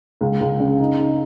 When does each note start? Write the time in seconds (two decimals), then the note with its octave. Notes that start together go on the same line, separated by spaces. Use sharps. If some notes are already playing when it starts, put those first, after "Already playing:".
0.21 C#2
0.41 C#2
0.60 C#3
0.80 D#4
0.99 D#4